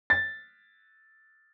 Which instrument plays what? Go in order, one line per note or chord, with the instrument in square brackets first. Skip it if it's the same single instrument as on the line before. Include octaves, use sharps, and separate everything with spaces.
[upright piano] A6